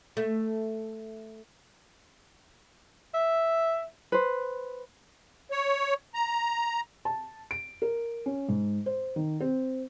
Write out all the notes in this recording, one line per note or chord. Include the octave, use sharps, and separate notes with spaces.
A3
E5
B4 C5
C#5
A#5
A5
D7
A#4
C#4
G#2
C5
D#3
C4